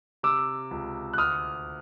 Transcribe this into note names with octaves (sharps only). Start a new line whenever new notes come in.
C3 D6 E6
C#2
F#6
D2 D#6 F6